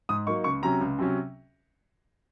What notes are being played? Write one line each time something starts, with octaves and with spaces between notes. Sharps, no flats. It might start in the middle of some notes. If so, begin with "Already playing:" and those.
G#2 D#6
F#3 A#3 D#4 C#6
C#2 C#6
C3 F#3 C#4 A#5
C#2
C3 F#3 C#4